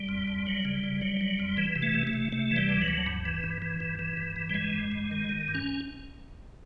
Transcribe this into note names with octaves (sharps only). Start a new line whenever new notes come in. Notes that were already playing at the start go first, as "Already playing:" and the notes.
Already playing: G3
F2
F2
F#3
C#3
C#3
F#3
F#3
F2
E3
C3
A3
C3
A3
C3
C3 A3
E3
G3
D2
F#3
D2
G2
E3
G2
E3
G2
E3
G2
E3
G3
G2 G#3
G2
G2
D#3
D#3
G2
C#4